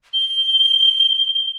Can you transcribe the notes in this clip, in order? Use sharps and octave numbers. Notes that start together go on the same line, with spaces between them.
G7